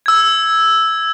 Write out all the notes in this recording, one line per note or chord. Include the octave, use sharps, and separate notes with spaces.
E6 G#6